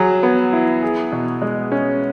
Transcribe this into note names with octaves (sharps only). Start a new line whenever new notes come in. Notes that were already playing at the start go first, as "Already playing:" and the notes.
Already playing: F#3 G#4
B3
E4
G#4
B2
G#3
C#4